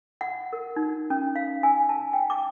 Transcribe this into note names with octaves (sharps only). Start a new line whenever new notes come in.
F#5
A#4
D#4
C#4
F5
G#5
A5
G5
D6